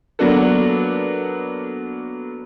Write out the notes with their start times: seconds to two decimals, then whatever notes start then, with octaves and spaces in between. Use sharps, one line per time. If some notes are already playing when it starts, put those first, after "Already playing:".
0.19 F#3 A#3 B3 D4 F#4 A4